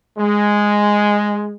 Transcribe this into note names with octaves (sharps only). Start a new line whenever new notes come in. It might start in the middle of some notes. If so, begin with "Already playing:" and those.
G#3